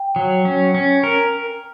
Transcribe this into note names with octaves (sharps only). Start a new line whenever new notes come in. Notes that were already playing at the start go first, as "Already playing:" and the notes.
Already playing: G5
F#3
C#4
C#4
A#4